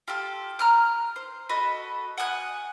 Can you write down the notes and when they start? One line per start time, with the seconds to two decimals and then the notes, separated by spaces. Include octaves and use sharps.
0.08 F4 G4 A4
0.59 A#5 F6 F#6
1.16 C5
1.49 F#4 A4 D#5 B5
2.18 F#5 G#5 D#6 F#6